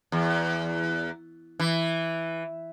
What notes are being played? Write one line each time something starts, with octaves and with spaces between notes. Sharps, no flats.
E2
E3